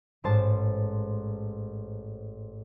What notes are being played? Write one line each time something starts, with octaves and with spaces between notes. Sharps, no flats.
A1 G#2 C5 A5